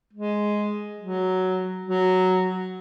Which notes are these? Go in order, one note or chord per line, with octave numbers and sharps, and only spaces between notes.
G#3
F#3
F#3